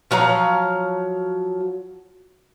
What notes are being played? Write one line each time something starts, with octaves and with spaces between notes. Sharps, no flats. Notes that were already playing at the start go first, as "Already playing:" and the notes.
F3 F#3 F5 A#5